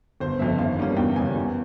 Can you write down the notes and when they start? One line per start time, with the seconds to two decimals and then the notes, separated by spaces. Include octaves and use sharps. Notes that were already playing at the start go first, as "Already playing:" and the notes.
0.20 G1 C5
0.39 F2 C#3 E5
0.59 G#1 F5
0.78 G2 G3 A#3 C#4
0.97 E2 G5
1.16 C#3 G3 C#4 G#5
1.35 E2